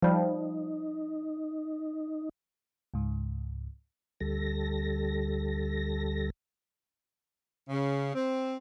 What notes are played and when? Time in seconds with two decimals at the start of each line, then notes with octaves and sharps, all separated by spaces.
0.02 F3 G3 D#4
2.94 C#2 G#2
4.20 D2 G3 A4 A#6
7.69 C#3
8.15 C4